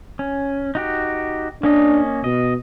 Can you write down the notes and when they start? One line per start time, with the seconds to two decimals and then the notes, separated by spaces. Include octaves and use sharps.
0.19 C#4
0.75 D#4 F#4 G4
1.63 A#3 C#4 D4 D#5
2.24 B2 D#5